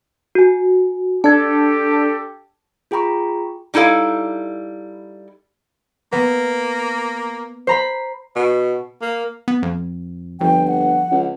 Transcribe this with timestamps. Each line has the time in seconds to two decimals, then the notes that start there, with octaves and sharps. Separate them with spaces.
0.35 F#4 G#5
1.24 D4 G4 A4 A5 G#6
2.91 F4 G#4 G5 A#5 B5 C#6
3.74 G3 D#4 E4 A4 F5
6.12 A#3 B3
7.67 C5 A#5 B5
8.35 B2
9.01 A#3
9.48 B3
9.63 F2
10.41 G1 F2 G5
10.68 F#5
11.11 C#2